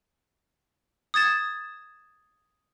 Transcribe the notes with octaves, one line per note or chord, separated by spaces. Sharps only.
D#6 G#6 A6 E7